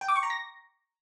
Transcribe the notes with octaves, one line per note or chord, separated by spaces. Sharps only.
G5
D6
C#6
A#5
A#6